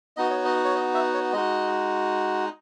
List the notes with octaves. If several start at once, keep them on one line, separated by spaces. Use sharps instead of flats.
B3 D#4 F#4 D#5
C#5
D#5
C#5
D#5
E5
C#5
G#3 D#4 F#4 D#5